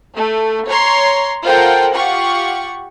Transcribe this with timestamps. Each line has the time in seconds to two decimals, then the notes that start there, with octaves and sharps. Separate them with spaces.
0.15 A3
0.67 C#5 A#5 C6
1.43 F4 A4 A#4 C5 F#5 G5
1.93 F4 G4 F#5 C#6